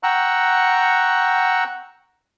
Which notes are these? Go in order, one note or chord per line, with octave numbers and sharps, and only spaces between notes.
F#5 G5 A#5 C#6 E6 F#6